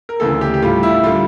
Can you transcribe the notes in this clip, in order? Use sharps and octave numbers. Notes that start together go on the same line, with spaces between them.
A#4
D2 C#3 E3 A4
G4
G4
A2 G3 F4
E4
D3 G3 F4